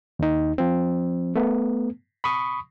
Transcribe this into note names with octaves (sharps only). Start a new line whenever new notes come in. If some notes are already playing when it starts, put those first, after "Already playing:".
D#2 D#4
F3 C4
A3 B3
B5 C#6 D#6